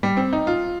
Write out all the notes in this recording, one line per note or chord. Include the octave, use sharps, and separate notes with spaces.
G3
C4
D#4
F4